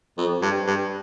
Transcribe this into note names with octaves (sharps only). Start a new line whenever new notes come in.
F2
G2
G2